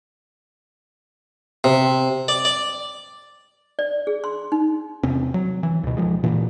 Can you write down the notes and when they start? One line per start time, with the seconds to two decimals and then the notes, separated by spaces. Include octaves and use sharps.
1.64 C3
2.28 D5
2.45 D5
3.79 D5
4.07 G#4
4.24 C6
4.52 D#4
5.03 E2 C3 C4 C#4
5.34 F#3
5.63 E3
5.83 C#2 B2
5.97 C#2 F3 G#3
6.23 A#2 E3